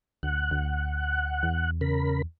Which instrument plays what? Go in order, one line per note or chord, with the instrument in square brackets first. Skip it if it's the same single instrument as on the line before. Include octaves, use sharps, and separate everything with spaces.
[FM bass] D2 [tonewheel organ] F#5
[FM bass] D2
E2
[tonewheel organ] C#3 A#4 B5